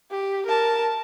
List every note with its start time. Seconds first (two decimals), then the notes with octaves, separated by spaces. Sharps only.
0.11 G4
0.46 A#4 A5